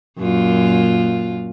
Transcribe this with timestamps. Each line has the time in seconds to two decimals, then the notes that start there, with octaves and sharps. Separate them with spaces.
0.18 F#2 A#2 F4